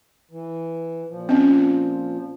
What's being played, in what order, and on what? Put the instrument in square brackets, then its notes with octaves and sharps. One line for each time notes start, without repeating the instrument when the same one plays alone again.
[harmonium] E3
A#2 F3
[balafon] C4 C#4